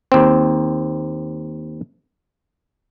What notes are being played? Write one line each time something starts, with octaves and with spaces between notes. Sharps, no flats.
D#2 C4